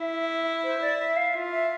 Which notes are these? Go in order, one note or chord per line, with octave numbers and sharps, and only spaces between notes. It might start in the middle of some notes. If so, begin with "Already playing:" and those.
Already playing: E4 E5
C5
D5
E5
F5
F4 E5
E5